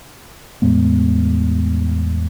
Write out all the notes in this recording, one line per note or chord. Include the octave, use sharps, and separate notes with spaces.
E2 A2 G#3 B3